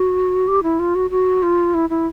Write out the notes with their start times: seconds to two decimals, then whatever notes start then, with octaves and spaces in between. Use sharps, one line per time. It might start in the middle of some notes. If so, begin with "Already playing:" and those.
Already playing: F#4
0.48 G4
0.63 E4
0.79 F4
0.95 F#4
1.10 F#4
1.43 F4
1.74 E4
1.90 E4